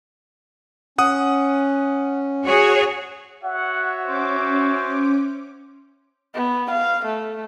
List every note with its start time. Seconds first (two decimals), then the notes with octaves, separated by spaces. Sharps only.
0.98 C#4 F#5 D#6
2.46 F#4 G#4 C#5
3.44 F#4 C#5 E5 F#5
4.06 C#4 C5 D6
6.35 B3
6.71 F5
7.06 A3